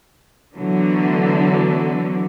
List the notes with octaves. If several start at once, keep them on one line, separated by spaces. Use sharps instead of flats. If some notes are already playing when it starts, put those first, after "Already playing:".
D3 E3 F#3 A3 B3